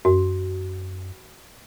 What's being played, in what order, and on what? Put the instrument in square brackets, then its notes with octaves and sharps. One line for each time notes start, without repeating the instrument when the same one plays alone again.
[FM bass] F#2 [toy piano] F#4